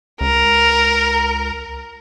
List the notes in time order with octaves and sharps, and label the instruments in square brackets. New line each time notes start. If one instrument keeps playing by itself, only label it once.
[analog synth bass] C#2 [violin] A#4